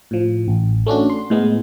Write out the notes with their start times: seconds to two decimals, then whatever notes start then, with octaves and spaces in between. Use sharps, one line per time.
0.11 A2 F3
0.48 A1
0.86 A3 C#4 D4 F#4
1.10 C6
1.30 A2 G#3 B3